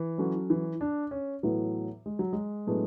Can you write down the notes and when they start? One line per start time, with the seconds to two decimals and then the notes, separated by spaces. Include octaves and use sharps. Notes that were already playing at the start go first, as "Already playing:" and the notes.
Already playing: E3
0.18 F#3 C#4 F#4 A4
0.50 E3
0.81 D4
1.11 C#4
1.43 A2 E3 F#3 B3
2.06 G#3
2.19 F#3
2.33 G#3
2.67 A2 F#3 B3 D4 G#4